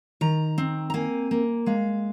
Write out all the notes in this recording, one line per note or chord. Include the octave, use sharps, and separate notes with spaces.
D#3 A#5
C4
A#5
A#3 G#5
A#3
G#3 F5